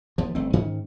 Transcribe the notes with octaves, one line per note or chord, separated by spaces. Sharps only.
D#2 F3
G1 A3 C4
G#2 D#3 C#4